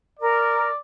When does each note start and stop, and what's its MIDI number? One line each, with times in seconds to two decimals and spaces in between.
0.19 0.66 70
0.19 0.78 74